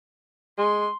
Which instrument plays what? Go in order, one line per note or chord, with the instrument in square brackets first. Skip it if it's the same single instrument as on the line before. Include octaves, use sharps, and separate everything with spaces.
[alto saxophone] G#3 [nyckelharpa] C6